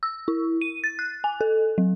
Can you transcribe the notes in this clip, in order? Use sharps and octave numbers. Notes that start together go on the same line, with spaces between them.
E6
E4
D#7
A6
F#6
G#5
A4
F#3